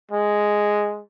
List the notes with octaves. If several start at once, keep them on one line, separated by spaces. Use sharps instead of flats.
G#3